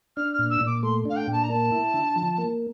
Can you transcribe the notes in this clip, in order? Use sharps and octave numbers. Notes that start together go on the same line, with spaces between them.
D4 F6
F6
A#2
E6
A#2
D6
A3 C6
D4 F5
G5
A#2 A5
A#5
A#3 A5
E4
D3
F3
A#3